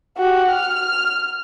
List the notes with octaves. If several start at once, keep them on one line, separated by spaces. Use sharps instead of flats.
F#4 G4
F6